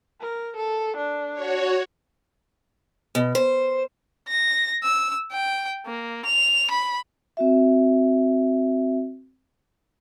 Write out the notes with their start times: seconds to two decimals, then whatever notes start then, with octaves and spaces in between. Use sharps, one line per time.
0.21 A#4
0.57 A4
0.97 D4
1.33 F#4 C#5
3.15 B2
3.35 C5
4.28 A#6
4.83 E6
5.32 G5
5.86 A#3
6.26 F7
6.71 B5
7.37 C4 F#4 E5